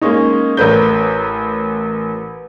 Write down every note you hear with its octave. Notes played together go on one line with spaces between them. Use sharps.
G#3 A#3 C#4 D#4
A1 A#4 B4 G6